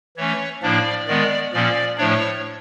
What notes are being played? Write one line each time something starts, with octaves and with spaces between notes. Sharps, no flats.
E3 A3 C#4 C#5
A2 F3 A#3 D4 D5
D#3 G#3 B3 D5
A#2 F3 A#3 C#4 D5
A2 F3 A3 D4 C#5